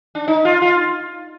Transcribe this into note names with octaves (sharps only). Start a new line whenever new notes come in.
D4
D#4
F4
F4